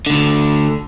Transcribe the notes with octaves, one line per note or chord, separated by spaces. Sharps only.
D2 D3